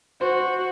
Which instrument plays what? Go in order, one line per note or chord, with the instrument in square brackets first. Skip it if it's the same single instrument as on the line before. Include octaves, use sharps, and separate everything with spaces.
[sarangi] F#4 [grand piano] C5